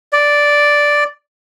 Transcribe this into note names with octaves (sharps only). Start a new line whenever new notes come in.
D5